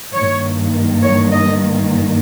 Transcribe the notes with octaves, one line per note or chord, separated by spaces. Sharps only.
G2 D#3 A#3 C#5
C#5
D#5